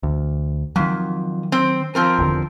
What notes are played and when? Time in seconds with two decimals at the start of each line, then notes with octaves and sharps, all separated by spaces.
0.03 D2
0.76 F2 D#3 F#3
1.52 C4
1.95 F3 C4 A#4
2.19 F1 E2 D3